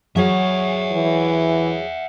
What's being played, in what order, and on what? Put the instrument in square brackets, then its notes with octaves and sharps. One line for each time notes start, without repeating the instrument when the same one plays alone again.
[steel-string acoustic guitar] F#3 G#4 C#5 [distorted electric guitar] E5 F#5
[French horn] E3